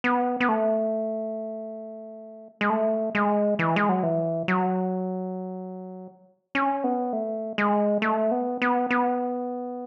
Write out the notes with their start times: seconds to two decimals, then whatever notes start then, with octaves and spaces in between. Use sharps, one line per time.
0.04 B3
0.40 B3
0.49 A3
2.61 G#3
2.70 A3
3.15 G#3
3.59 E3
3.76 G#3
3.89 F#3
4.03 E3
4.48 F#3
6.55 C#4
6.84 B3
7.13 A3
7.58 G#3
8.02 A3
8.31 B3
8.62 B3
8.90 B3